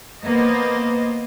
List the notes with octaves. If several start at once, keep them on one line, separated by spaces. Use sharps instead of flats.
A#3 B3 C5 D#5